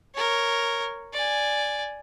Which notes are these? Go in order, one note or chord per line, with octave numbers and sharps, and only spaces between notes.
A#4 C#5
D5 G#5